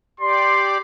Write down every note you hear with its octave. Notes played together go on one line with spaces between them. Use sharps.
G4 D5 C6